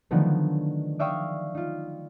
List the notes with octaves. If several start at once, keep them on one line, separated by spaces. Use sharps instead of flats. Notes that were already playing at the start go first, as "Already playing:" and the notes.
D3 D#3 F3 F#3 A3 B3
D5 E5 F5 G5 C#6 D#6
D#4 F4